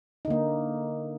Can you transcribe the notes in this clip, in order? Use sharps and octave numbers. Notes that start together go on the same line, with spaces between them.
D3 A#3 D#4